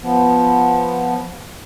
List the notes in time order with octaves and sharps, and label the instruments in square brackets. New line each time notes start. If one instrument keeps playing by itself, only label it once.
[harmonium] F3 B3